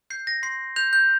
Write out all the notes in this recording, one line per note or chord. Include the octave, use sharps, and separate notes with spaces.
G6 C7
A#6
C6 C7
G6 F7
G6